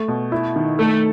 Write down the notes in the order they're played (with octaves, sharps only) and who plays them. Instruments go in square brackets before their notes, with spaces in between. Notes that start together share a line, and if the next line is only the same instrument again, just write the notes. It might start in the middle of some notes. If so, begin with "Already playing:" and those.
Already playing: [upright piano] A3
B2
E4
D#3
[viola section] A3 [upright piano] A4